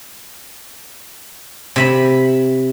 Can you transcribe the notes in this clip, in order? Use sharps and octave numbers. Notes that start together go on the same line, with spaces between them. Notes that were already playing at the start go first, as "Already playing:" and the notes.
C3 E5 B5